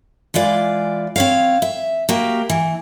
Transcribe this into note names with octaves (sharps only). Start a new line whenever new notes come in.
E3 G#3 F4 D5
C4 C#5 F5
E5
A#3 F#4 G4
E3